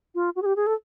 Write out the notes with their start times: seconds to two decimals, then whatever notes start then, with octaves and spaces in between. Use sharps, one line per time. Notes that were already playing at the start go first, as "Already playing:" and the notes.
0.15 F4
0.36 F#4
0.42 G#4
0.46 G4
0.56 G#4
0.67 A4